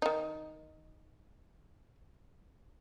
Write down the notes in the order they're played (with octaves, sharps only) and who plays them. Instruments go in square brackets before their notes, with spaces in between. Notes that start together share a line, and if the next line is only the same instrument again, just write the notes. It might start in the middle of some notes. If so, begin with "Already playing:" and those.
[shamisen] D#3 D#4